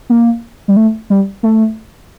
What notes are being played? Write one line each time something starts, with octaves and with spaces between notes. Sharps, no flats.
A#3
G3
A3
G3
A3